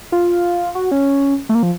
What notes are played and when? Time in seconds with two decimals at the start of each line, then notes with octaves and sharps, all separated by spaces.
0.12 F4
0.75 F#4
0.91 C#4
1.49 A3
1.55 A#3
1.63 F3